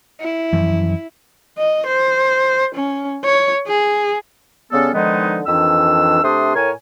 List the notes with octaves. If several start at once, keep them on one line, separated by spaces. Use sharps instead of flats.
E4
F#2 E3 F3
D#5
C5
C#4
C#5
G#4
C#3 G3 B3 C#4 A4
D3 D#3 F3 G#3 B3 D#4
F2 D#3 E3 D4 E6
C3 A3 D4 G4 C6 D#6
A2 A#4 C#5 G#5